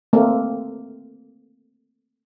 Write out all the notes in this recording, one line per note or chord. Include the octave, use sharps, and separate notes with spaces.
A3 A#3 C4